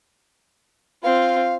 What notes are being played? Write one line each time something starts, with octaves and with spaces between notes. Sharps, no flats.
C4 F4 F5